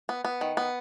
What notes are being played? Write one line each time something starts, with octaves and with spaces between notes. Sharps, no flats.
B3
B3
D#3
B3